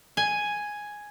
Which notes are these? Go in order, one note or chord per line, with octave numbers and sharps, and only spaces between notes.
G#5